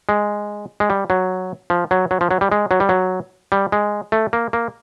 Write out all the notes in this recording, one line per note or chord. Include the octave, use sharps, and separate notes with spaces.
G#3
G#3
G3
F#3
F3
F#3
F#3
F3
F#3
G3
G#3
F#3
G3
F#3
G3
G#3
A3
A#3
A#3